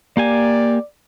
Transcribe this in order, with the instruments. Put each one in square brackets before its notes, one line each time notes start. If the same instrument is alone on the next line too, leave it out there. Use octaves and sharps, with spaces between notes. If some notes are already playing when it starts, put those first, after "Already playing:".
[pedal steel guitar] A#3 G4 G#5 [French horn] D5